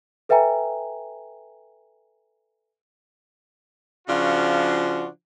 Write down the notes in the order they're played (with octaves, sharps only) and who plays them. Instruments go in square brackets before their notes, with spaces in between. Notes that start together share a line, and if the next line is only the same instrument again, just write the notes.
[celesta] A4 B4 E5 G5 G#5 A#5
[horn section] C#3 F3 D4 F4 F#4